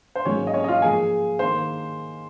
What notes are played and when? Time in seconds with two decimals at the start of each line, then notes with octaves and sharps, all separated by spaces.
0.15 C5
0.25 G#2 F#3 A#3 C#4 C#5
0.47 D#5
0.54 C#4 C#5
0.64 D#5
0.68 F4 F5
0.82 G#2 F3 A#3 G#4 G#5
1.39 D#3 A#3 C5 C6